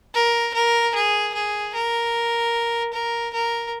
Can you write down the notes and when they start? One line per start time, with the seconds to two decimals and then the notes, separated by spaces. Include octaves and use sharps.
0.14 A#4
0.54 A#4
0.95 G#4
1.34 G#4
1.75 A#4
2.93 A#4
3.33 A#4